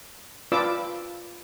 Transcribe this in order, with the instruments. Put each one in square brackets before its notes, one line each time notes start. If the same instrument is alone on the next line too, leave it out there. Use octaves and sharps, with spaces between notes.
[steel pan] F4 B4 D5 D6 E6